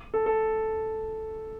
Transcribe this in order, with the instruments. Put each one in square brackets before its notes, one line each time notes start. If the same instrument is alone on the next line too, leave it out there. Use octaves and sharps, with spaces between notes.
[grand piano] A4
A4